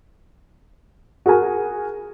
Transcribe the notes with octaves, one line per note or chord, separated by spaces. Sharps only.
F#4 G#4 A#4 G#5